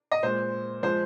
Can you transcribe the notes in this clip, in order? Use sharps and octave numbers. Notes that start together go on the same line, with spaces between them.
D#5
A#2 G#3 C5
F3 G#3 C5